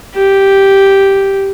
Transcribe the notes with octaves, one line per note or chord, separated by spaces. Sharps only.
G4